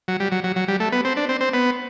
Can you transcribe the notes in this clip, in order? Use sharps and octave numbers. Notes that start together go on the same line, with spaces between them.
F#3
G3
F#3
F#3
F#3
G3
A3
B3
C4
D4
C4
C4
B3